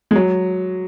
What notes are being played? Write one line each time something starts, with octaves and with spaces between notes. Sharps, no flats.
G#3
F#3